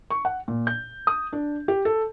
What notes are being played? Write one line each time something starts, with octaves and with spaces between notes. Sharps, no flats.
C#6
F#5
A#2
G6
D#6
D4
G4
A4